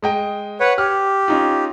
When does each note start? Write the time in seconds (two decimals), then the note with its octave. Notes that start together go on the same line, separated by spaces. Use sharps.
0.02 G#3 D#5 G5
0.60 B4 C#5 F#5
0.78 G4 F6
1.28 C#4 D#4 F4